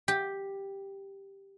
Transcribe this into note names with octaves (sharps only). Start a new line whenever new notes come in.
G4